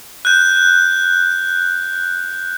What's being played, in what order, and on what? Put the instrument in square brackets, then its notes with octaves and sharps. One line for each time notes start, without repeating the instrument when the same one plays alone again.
[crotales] F#6 G6